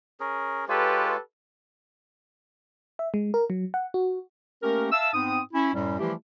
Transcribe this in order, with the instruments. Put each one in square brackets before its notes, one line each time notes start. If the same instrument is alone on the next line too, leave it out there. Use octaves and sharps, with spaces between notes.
[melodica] C#4 G#4 A#4
[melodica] G#3 F4 C#5 [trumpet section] G4 A4 B4
[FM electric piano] E5
G#3
A#4
F#3
F#5
F#4
[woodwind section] A3 A#3 C#4 G4 A#4
E5 F5 A5 E6
G#2 B3 C4 G5 D#6
C#4 E4
F#2 A2 G3
E3 F3 G3 A3 E4 G4